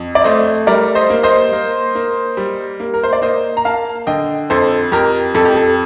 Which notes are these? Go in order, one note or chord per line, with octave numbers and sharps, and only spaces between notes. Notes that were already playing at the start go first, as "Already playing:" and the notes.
Already playing: F2
D5
A3 C5 D#5
G3 A#4 D5
C5 D#5
A#3
C5 D#5
A#3
A#3
G3
A#3
A#4
C5
D5
A#3 C5 D#5
A#5
A#3 F5 A5
D3 D#5 G5
F2 A4 C5
F2 G4 A#4
F2 A4
G4
A4